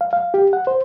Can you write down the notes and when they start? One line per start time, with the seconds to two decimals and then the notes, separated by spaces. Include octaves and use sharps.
0.01 F5
0.13 F5
0.34 G4
0.53 F#5
0.67 C5